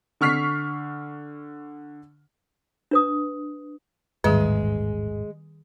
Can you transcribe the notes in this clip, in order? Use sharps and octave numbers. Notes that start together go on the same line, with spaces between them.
D3 C#6 F6 B6 C7
D4 B4 D#6
D#1 A1 G#2 D#3 G3 G#3 G#4